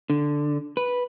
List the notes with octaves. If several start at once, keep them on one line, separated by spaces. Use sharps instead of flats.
D3
B4